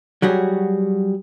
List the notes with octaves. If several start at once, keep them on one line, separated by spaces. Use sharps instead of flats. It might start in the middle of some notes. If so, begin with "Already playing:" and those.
F#3 G3 F#4 G#4